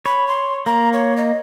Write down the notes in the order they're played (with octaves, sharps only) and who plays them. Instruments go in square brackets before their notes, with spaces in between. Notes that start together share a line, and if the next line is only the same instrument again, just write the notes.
[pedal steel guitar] C#5 [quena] B5
[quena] C6
[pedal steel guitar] A#3 [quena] A#5
[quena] C#5
D#5